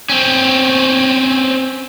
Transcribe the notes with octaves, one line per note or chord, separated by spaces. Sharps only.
C4 C#4